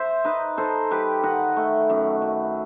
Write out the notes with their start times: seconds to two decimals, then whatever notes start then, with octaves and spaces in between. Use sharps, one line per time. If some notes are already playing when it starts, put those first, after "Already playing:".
Already playing: C5 E5
0.24 D#4 B4 D#5
0.58 D#4 A4 C5
0.91 G3 G4 B4
1.23 D#3 D#5 F#5
1.56 A3
1.90 F#2
2.22 F#2